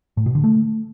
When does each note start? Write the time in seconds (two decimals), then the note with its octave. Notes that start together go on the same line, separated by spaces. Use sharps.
0.17 A2
0.26 B2
0.35 D3
0.44 A3